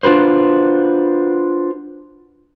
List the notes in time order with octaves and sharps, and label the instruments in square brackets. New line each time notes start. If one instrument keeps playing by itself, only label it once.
[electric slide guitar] D4 F4 F#4 B4 C5